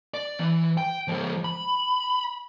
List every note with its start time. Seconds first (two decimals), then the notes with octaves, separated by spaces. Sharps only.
0.14 D5
0.39 E3
0.77 G5
1.08 F3 G#3
1.44 B5